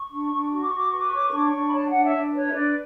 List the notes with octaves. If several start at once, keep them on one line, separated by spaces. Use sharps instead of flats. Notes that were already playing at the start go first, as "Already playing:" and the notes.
Already playing: C#6
D4
D4
F#4 C#6
D6
F#4 C#6
D6
B4 C#6
D6
C#6
C#5 D6
C#6
D4 D6
C#6
D4
B5
C#5 A5
F#5
D4
E5
D4
B4 C#5
E5
D4 D5